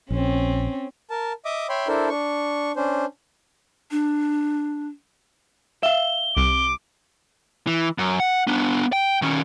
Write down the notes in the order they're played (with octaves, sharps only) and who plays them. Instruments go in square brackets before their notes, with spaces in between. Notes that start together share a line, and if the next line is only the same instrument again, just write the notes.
[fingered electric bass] A#1 [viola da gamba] C4 C#4
[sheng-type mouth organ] A#4 A5
D#5 E5 D6 D#6
C#5 E5 G5 B5 C6
D4 E4 A4 A#4 C5
D4 C#6
C#4 D4 C5
[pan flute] D4
[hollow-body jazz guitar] E5 F5 [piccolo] G7
[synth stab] C2 [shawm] D6
[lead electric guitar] E3
F#2
F#5
B3 D4
G5
D#3 C#4